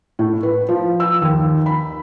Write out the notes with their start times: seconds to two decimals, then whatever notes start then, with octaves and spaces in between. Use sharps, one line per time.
0.19 A2
0.43 B4
0.69 F3
1.00 E6
1.22 D#2
1.66 B5